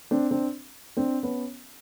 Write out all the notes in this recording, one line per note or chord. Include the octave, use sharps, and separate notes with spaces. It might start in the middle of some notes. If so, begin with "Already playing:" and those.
C4 D4
C4 D4
C4 D4
B3 C#4